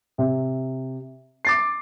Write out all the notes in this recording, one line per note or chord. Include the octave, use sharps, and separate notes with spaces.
C3
D6 A6 C7